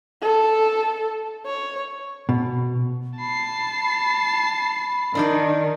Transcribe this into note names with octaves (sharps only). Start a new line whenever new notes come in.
A4
C#5
B2
A5 B5 C7
D#3 D4 D#4 D5